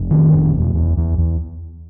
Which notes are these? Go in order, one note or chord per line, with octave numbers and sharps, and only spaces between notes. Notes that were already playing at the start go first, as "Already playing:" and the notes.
Already playing: F1
D#3
F1
E2
E2
E2
E2